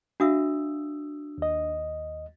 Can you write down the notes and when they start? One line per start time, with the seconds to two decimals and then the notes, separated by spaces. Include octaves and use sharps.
0.20 D4 F#4 E5 F5 D#6 E6
1.38 D#2 D#5